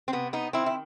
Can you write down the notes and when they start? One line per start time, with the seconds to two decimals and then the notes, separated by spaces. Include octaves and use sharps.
0.08 C4
0.13 C3 B3
0.33 B3 D#4
0.53 D#3 C4 E4
0.66 E4